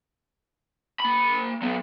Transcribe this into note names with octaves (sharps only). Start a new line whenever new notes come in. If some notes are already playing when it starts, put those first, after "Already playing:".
A#3 B5
F#3 B3